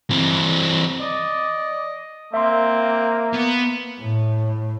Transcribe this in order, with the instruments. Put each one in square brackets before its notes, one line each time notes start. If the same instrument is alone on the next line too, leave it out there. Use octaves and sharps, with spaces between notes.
[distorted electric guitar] E3 C4
[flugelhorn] D5 [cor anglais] D#5
[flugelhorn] A#3 [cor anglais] C4 [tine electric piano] E5 C6
[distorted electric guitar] B3
[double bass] A2